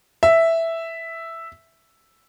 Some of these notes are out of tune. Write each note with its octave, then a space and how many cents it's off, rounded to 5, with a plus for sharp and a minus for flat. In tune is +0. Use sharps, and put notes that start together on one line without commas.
E5 +0